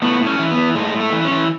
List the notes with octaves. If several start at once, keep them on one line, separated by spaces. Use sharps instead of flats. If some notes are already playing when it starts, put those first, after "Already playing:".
A2 B3
A2
C#4
E3
B3
E3
A2 G#3
A2
A3
E3
C#4
E3